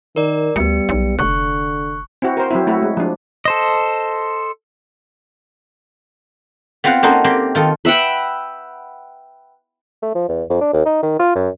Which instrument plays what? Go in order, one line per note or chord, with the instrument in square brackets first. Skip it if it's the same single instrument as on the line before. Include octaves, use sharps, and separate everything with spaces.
[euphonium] D#3 [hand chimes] A#4 D5
[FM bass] D2 [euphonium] G3 [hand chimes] B3 C#7
[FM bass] B1
[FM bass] F1 [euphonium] D3 [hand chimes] C#6 F#6
[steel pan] C4 E4 F#4
A#4 C5
F#3 C4 E4
A3 E4 F#4
G#3
F3 D4
[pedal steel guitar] A4 C5 D#5
[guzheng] B3 C4 F4 C5 F5 F#5
A#3 C#4 D#4 F#4 A4 C5
A#3 C4 G4 G5
D#3 F4 A4
[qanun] B4 E5 F#5 G5
[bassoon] A3
F3
E2
F2
D4
D#2
D#4
D#3
F4
F#2